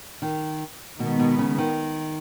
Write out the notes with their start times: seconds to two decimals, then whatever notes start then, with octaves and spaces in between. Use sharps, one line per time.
0.22 D#3
0.99 B2 D#3 G#3 B3
1.19 B2
1.39 C#3
1.58 D#3